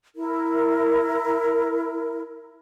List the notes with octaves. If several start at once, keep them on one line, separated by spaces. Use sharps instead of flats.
E4 A#4